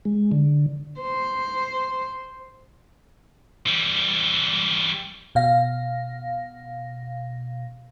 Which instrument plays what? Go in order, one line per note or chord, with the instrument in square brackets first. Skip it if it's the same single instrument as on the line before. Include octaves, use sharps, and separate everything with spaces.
[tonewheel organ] G#3
D3
[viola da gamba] C5
[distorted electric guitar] E3 G3
[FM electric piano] B2 F5 A#6